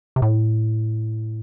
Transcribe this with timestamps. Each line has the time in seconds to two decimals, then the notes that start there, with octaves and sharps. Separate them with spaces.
0.16 C3
0.22 A2